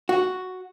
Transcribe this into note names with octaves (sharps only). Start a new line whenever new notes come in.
F#4